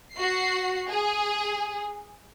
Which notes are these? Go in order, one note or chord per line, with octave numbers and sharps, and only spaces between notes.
F#4 C7
G#4